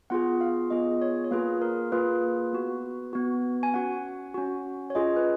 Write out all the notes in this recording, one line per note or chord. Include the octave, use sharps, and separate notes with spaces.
B3 F4 G#4 F#5
F5
B3 F4 G#4 D#5
C#5
C#5
A#3 F4 G#4 B4
A#4
A#3 F4 G#4 B4
B3 F#4
B3 F#4
G#5
C#4 F#4 F#5
C#4 F#4
C#5
C#4 F4 G#4 D#5
B4